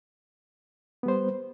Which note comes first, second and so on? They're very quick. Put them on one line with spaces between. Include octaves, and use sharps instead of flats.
B3 G3 C5